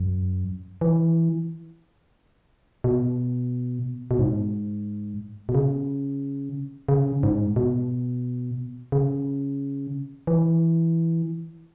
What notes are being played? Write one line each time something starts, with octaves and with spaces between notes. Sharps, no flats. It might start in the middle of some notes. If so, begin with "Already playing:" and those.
Already playing: F#2
E3
B2
B2
G#2
B2
C#3
C#3
G#2
B2
C#3
E3